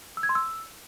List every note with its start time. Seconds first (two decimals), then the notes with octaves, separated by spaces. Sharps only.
0.17 E6
0.23 G#6
0.29 C6
0.35 E6